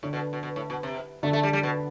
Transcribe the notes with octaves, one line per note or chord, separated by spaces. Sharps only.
A2 D3
B2
B2
B2
A2
B2
C3
D3 A3
A3
G3
G3
B2